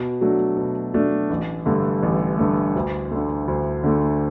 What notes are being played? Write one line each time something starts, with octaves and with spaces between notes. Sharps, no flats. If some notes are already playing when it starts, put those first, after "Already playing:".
Already playing: B2
F#3 A3 D4
B2
F#3 A3 D4
A1
G2 D3 A3
A1
G2 D3 A3
D2
D3 A3
D2
D3 A3